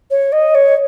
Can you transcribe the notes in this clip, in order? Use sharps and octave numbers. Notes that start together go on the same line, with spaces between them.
C#5
D#5
C#5